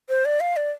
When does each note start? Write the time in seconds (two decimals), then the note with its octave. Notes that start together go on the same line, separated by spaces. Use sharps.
0.09 C5
0.25 D5
0.40 F5
0.56 D5